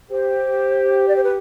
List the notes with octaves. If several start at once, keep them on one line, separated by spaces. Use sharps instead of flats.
G4 C5
D5
C5
B4